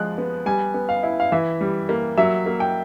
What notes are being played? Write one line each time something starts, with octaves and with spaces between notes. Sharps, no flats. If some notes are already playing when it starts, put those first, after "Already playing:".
Already playing: F3 G#3 F#6
B3
G3 G#5
B3
F5
E4
F5
E3 E5
G3
A#3
F#3 E5
A#3
G5